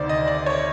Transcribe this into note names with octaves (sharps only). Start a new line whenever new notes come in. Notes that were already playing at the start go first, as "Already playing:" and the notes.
Already playing: D2 C3 D#3 C5 D5
D#5
D5
C#5